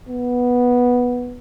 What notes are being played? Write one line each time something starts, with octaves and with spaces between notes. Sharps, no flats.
B3